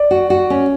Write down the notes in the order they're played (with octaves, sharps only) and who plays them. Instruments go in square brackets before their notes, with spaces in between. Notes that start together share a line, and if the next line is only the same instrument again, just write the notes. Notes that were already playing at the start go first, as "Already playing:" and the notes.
Already playing: [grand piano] D5
[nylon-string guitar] F#4
F#4
C#4